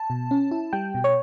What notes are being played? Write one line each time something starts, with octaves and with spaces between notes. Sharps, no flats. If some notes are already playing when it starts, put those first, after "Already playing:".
Already playing: A5
B2
C#4
E4
G3 G5
B2
C#5